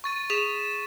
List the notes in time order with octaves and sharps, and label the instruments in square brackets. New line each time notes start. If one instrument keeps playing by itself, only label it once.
[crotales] C#6 A6 D#7
[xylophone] G#4 [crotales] B6 E7